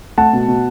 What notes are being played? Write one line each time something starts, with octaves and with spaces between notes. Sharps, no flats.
A3 F#5 A5
B2
B2